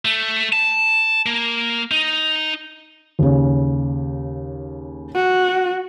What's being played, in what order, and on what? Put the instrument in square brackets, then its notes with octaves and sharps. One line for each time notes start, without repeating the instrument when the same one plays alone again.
[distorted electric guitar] A3
A5
A#3
D#4
[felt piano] D#2 C#3
[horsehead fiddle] F#4